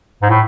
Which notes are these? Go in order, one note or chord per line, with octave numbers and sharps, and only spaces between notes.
G#2
A2